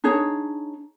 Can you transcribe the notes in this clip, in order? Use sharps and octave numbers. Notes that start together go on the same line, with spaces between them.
D4 D#4 G#4 C#5